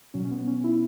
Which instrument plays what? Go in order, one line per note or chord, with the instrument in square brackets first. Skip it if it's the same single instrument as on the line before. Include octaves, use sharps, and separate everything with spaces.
[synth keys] B2 F#3 C#4
C#4
B3
C#4
E4